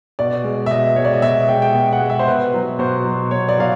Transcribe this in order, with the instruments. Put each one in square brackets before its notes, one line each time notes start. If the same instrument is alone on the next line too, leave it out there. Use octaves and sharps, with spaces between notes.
[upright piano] B2 D5
G#3
E5
B2 D#5
G#3 C#5
D5
D#5
B2 E5
G#3 G5
G5
B2
F#5
G#3
E5
C5
B2 B4
F#3
B2 C5
F#3
B2 C#5
D5
F#3 F5